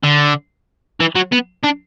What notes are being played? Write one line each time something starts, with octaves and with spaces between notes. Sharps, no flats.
D3
E3
F#3
B3
D4